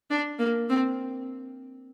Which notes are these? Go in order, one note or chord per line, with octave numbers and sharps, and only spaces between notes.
D4
A#3
C4